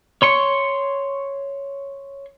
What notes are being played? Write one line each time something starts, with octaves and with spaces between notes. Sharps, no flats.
C#5 C6 C#6